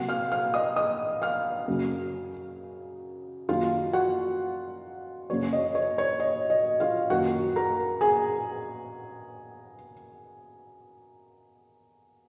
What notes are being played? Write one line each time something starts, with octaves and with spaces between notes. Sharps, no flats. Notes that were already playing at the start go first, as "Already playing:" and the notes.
Already playing: C3 F#3 A#3 F#5
F5 F6
F5 F6
D#5 D#6
D#5 D#6
F5 F6
F#2 C#3 F#3 A#3
F#2 D#3 A#3 F4 F5
F#4 F#5
F#2 C#3 F#3 A#3 C#5
D#5
C#5
C#5
D#5
D#5
F4 F5
F#2 D#3 A#3 F#4 F#5
A#4 A#5
G#4 G#5